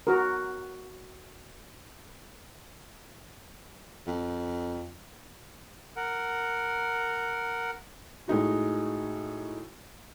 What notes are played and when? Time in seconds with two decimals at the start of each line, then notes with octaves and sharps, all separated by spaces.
0.07 F#4 A#4
4.07 F2
5.96 A#4 F#5
8.28 A2 G#3 D#4 F#4